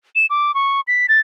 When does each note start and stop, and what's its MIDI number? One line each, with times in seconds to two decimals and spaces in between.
0.15 0.26 100
0.30 0.54 86
0.54 0.81 85
0.87 1.06 95
1.09 1.20 93